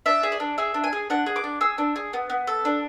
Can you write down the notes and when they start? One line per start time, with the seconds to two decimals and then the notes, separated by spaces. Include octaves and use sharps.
0.06 D4 E5
0.23 G#4
0.32 D5
0.40 D4
0.58 G#4 E5
0.74 D4
0.84 G#5
0.93 G#4
1.10 D4 F#5
1.26 G#4
1.36 D6
1.44 D4
1.61 G#4 E6
1.78 D4
1.96 G#4
2.13 B3
2.30 B3
2.47 A4
2.65 D4